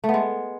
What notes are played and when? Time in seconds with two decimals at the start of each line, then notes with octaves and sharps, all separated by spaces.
0.04 A3
0.09 B3
0.14 G#3